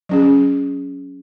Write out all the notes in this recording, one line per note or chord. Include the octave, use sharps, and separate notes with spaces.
F#3 C#4 G#4